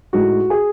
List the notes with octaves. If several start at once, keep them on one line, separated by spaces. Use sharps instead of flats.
A2 G#3 D#4 F#4
G#4